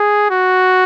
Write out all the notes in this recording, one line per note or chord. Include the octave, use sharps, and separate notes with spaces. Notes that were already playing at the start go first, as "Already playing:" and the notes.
Already playing: G#4
F#4